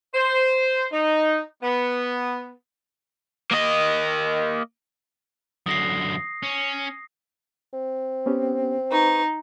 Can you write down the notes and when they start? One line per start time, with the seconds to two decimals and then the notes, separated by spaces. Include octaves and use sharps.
0.14 C5
0.92 D#4
1.63 B3
3.51 A#3 D#5
5.66 F#2 D3 D#6 A#6 C7
6.43 C#4
7.73 C4
8.26 B3 C#4 G4
8.92 D#4 B4 C#6